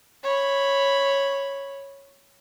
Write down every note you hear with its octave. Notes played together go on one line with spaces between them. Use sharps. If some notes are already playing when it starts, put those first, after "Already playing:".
C#5 B5